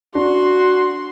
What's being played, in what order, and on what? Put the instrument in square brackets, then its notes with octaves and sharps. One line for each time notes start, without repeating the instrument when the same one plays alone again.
[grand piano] D4 [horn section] F#4 [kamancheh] C6